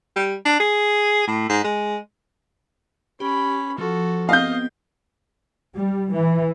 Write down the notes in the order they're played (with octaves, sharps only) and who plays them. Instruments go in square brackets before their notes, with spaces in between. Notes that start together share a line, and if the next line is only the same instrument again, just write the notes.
[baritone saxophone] G3
D4
G#4
A2
G#2
G#3
[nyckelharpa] C#4 B5 [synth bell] G4
[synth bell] F3 [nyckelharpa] F#4 A4
[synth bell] B3 C4 [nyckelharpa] D#5 [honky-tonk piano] F5 G6
[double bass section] G3
E3